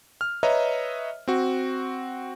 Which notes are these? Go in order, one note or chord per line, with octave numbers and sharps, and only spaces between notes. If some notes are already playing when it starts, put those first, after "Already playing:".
F6
B4 C#5 D#5 E5 A#5
C4 F#4